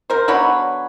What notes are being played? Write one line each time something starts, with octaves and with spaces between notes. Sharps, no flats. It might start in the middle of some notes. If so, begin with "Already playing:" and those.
A#4 C5
D3 F#3 B3 B4 C#5